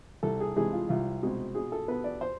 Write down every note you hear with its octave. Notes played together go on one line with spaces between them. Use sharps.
C2 A4
G#4
C3 E3 G#3 G#4
F4
C2 F4
B2 G#3 C4
B2 G#4
A4
B3 B4
D5
C5